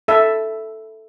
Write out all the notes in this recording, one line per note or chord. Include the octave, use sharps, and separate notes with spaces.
A4 E5